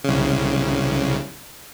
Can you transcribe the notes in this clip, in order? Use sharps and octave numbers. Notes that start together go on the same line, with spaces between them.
C2 C#3